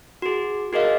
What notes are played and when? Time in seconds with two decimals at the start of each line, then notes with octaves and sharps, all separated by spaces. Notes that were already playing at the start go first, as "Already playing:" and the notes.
0.22 F#4 G#4
0.73 F#4 G#4 A#4 D#5 F5